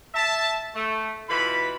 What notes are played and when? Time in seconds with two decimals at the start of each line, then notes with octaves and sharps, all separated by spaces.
0.14 E5 A5
0.75 A3
1.29 B2 E3 F4 B5